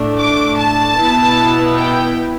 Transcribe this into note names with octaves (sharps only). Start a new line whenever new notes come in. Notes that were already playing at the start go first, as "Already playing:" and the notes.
Already playing: A2 A3 D4
D6
A5
B2 B3 E4
G5